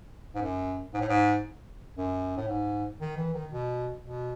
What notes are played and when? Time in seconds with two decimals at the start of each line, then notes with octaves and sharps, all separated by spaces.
0.35 G#2
0.42 F#2
0.94 G#2
1.01 A2
1.09 G#2
1.97 F#2
2.37 A2
2.48 G#2
3.01 D#3
3.17 E3
3.34 D#3
3.51 B2
4.03 B2